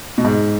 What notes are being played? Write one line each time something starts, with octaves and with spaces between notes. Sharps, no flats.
B2
G#2